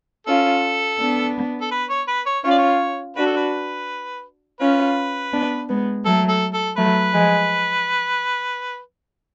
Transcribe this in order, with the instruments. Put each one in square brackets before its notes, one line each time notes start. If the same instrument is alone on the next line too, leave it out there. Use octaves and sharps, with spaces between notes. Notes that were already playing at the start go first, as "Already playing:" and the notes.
[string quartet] C#4 F4 [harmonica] A4
[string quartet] B3 D4
[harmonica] A4
B4
C#5
B4
C#5
[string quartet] C#4 F4 [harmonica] C#5
[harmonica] D5
C#5
[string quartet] D4 F#4 [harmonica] B4
[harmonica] A4
B4
[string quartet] C#4 F4 [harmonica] B4
[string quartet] B3 D4
G#3 B3
[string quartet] F#3 A3 [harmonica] A4
[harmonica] A4
A4
[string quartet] F#3 A3 [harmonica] B4
[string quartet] F3 G#3